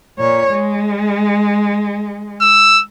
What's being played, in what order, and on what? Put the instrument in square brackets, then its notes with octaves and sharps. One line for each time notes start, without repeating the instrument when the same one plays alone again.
[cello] A#2 C#5
G#3
[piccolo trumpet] E6